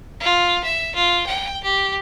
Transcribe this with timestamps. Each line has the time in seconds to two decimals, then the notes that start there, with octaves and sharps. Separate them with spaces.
0.20 F4
0.64 E5
0.95 F4
1.26 G5
1.63 G4